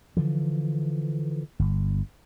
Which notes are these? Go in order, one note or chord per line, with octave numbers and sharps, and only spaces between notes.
D3 E3 F3
G1